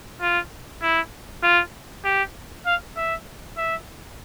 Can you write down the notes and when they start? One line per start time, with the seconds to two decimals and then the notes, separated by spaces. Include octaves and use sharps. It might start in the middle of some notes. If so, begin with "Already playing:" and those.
0.21 F4
0.82 E4
1.43 F4
2.04 G4
2.66 F5
2.97 E5
3.57 E5